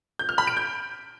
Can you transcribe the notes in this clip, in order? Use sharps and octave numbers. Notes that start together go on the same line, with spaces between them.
G6
F6
B5
D7
G6